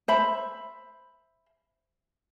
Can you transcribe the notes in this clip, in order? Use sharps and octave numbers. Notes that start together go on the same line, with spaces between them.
C5 E5 B5